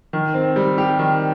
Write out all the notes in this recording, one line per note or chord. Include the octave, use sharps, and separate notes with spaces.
D#3
C4
G3
G4
D#3